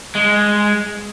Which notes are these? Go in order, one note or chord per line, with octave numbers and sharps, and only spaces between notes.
G#3